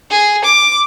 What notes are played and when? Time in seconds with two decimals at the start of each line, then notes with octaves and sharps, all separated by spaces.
0.11 G#4
0.44 D6